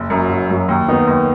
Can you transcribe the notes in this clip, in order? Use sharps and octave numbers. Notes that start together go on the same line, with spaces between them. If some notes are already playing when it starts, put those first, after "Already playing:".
Already playing: F#1
F#2 F#3
F#1
F#2 F#3
D#2
D#3 B3 D#4
D#2